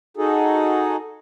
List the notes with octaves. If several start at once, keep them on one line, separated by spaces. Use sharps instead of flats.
D#4 F#4 G#4 A4